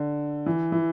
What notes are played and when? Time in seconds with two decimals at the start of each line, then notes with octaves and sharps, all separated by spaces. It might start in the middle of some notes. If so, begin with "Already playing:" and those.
Already playing: D3
0.46 E3
0.72 E3